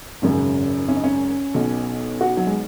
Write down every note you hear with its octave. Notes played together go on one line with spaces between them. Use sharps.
G#1 F#2 C#3 C#4
C#4
D#4
C#4
B1 B2
F#4
F#3
G#3